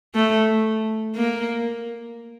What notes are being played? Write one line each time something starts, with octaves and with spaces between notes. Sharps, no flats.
A3
A#3